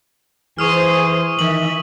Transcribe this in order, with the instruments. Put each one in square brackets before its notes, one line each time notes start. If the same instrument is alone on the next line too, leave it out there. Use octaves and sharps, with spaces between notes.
[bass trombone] E3 [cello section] G#4 C5 [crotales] C#6 D#6 F6
[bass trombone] D#3 [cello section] E3 E5 [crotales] F#7